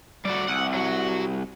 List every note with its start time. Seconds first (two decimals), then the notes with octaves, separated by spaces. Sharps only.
0.25 G3 A3 F#4 D5
0.48 C2 F#5
0.74 F#3 F#4